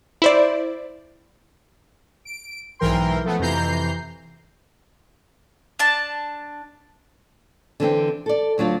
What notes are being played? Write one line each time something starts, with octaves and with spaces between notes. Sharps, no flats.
E4 C5 D5
D7
B1 G#2 E3 A#4 G5 C6
F3 A3 B3
F2 C3 E3 A#5 G6 C7
D4 A5
D3 E3 C4 G5
A4 D5
D2 F#3 D4 F4